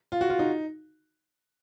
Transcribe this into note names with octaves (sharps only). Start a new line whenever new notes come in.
F4
F#4
F4
D#4